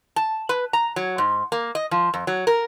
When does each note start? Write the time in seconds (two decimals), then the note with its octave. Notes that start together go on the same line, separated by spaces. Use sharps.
0.16 A5
0.49 B4
0.73 A#5
0.96 F#3
1.18 G#2
1.52 A#3
1.75 D#5
1.91 F3
2.14 F2
2.27 F#3
2.47 A#4